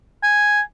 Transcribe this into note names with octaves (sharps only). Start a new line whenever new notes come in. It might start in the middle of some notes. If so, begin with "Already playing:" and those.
G#5